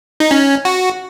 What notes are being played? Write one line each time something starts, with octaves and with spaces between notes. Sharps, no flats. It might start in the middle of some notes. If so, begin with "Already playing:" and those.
D#4
C#4
F#4